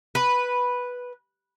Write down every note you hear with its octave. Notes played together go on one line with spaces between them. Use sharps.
B4